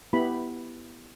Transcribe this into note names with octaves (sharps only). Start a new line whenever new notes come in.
B3 E4 G4 B5